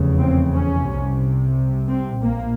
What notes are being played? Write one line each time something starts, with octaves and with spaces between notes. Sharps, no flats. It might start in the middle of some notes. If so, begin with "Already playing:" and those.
Already playing: F1 E2 C#3
C4
C#4
C2 C3
C4
A#1 A#2 A#3